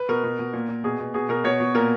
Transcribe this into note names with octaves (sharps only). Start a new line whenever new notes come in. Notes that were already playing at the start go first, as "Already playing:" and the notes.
Already playing: B4
B2 A#4
B2
B2
A#2
A#2
B2 G#4
B2
B2 G#4
B2 A#4
B2 C#5
B2
A#2 A#4